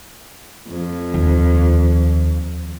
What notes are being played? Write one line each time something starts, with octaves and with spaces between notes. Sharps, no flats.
F2
D#2